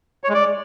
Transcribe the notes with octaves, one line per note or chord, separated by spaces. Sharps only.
C#5
G#3
D5